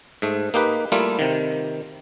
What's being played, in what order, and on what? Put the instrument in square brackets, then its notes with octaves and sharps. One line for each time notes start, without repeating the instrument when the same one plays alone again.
[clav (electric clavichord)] G#2 A3
A#3 D#4 G4 B4
G3 A3 A#3 E4 F4
C3 D#3